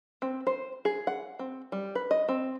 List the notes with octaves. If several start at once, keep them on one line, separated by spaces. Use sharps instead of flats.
C4
C5
G#4
F#5
C4
G3
B4
D#5
C4